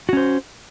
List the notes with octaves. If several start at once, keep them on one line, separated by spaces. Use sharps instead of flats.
C#4 F#4 C5